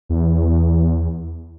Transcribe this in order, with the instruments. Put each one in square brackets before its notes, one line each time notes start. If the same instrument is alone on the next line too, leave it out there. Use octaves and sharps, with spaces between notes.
[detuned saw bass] E2